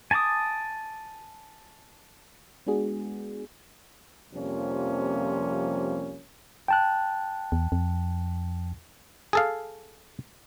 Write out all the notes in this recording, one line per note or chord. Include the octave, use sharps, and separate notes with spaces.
G#5 A5 B5 D6 D#6
G#3 B3 D4 F#4 G#4
F2 C3 F3 G3 A#3 C#4
G5 A5 F#6
E2
F2
G#4 A4 F5